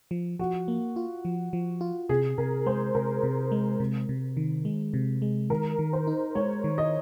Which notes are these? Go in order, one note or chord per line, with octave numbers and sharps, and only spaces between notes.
F3
F3 F#4
A#3
F4
F3
F3
F4
C3 G#4
C3 A#4
G#3 C5
C3 A#4
C3
G#3
C3
C3
D#3
G#3
C3
G#3
D#3 A#4
D#3
C5
D#4
G#3 C#5
D#3
D#5